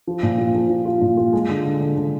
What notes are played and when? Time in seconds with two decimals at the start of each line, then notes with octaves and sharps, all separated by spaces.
0.07 F3
0.23 A#2
0.38 F3
0.55 F3
0.69 F3
0.85 F4
1.01 A#2
1.17 F4
1.33 G#3
1.49 D3
1.65 D3
1.80 D3
1.96 D3